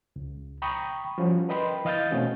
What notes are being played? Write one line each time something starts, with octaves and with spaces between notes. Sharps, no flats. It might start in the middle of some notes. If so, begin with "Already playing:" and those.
C#2
G5 A#5 B5 C#6 D#6
F3 G3 C#4 F#4
A#4 B4 D#5 G5 B5 C6
E3 D#5 F5 D#6 G6 A6
B2 A3 C4 C#4 F#4